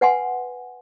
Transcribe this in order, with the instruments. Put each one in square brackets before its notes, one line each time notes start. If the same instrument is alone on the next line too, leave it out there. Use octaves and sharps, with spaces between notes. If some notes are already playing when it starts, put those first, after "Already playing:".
[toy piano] B4 F#5 G#5 C6